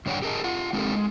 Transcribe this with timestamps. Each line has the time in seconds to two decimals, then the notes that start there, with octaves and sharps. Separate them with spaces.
0.06 G2 D3 C#5 D5 F#5 G5
0.22 G4 G#4 A#4 C5 D#5 A5
0.44 F4 F#5
0.73 G#3 C4 D#4 G4 A4 A#4
0.96 G#3